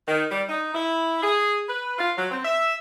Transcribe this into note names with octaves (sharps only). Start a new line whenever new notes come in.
D#3
G3
D#4
E4
G#4
B4
F4
F#3
C4
E5